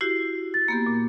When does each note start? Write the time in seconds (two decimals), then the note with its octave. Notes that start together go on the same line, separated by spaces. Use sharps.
0.01 E4 F#4 G4 C7
0.54 A6
0.68 A#3 B3 G4
0.87 A#2